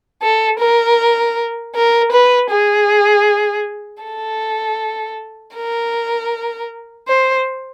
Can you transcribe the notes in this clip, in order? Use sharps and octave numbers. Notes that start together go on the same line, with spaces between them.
A4
A#4
A#4
B4
G#4
A4
A#4
C5